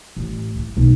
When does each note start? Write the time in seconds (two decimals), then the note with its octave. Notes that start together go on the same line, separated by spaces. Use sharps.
0.17 A1
0.56 E3
0.77 B1